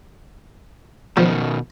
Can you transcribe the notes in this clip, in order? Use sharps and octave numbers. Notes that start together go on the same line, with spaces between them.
B2 D#3 F3